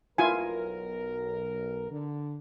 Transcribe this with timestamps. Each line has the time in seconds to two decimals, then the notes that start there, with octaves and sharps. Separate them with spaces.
0.18 B1 E4 F4 A#4 G#5
1.91 D3